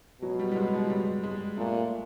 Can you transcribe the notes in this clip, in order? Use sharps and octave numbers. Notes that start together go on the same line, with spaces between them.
B2 F#3
G3
G3
G#3
G#3
F#3
G3
G#3
A#2 A3